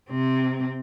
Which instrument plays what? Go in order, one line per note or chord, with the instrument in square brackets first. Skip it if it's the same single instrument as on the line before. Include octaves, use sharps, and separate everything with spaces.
[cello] C3 C4